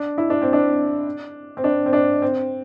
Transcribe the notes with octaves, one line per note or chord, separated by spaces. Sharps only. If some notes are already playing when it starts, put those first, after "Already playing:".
Already playing: D4
E4
D4
C4
D4
C4
D4
C4
D4
C4